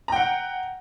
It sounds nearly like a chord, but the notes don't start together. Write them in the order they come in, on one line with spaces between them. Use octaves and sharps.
A#5 G5 F#5